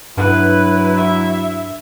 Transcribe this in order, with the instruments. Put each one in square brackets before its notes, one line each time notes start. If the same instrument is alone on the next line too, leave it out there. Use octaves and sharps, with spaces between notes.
[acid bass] G2 [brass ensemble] F#3 E4 [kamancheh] B4
[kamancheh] E5